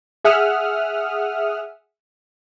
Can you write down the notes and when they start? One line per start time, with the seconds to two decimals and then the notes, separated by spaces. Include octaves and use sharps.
0.24 G#4 E5 F#5 D#6 F6